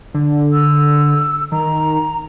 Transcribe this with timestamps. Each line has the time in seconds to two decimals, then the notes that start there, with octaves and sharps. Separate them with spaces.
0.14 D3
0.53 E6
1.52 D#3 A#5